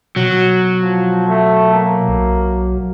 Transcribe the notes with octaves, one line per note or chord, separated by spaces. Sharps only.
B2 F#3
F3
A3
A#3
B1